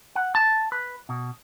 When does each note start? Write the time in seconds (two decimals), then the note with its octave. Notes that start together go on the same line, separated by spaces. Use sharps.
0.15 F#5
0.35 A5
0.72 B4
1.09 B2